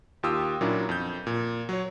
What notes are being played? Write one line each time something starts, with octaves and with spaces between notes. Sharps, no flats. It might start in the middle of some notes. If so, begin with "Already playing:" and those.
D#2 F4 G4 D#6 E6
A#2 F#3 A#3 C#4 D4 E4
F2 G6
A#2
F#3 C#5